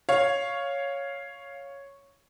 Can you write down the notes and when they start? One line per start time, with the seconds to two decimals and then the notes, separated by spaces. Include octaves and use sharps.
0.09 C#5 F5